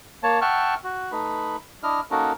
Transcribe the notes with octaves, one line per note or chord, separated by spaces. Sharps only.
A#3 C#5 A5
E5 F#5 G5 A5 C#6 F6
F#4
A3 D#4 B4 B5
D4 E4 D#5 F6
A#3 C#4 D#4 F#4 A4 A#4